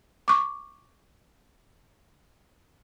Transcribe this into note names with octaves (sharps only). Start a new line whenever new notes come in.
C#6 D6